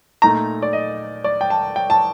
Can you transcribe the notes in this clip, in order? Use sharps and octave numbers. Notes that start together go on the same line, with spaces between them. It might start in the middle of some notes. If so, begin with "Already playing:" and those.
A#2 A3 D#4 A#5
D5
D#5
D5
G5
A5
G5
A5